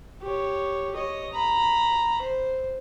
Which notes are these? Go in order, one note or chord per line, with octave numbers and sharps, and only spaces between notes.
G4 C#5
C#5 D#5
A#5 B5
C5